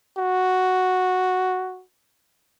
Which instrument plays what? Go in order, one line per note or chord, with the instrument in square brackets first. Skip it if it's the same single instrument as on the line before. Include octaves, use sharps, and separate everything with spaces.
[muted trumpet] F#4